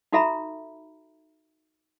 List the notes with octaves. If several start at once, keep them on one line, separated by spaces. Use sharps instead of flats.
D#4 F#4 A4 E5 A#5 B5